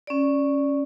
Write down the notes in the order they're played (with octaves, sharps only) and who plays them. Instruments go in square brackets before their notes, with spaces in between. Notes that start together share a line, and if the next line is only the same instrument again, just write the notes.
[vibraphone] C#4 D5